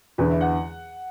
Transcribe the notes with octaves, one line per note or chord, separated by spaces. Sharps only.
E2 D3 B4
E5
F#5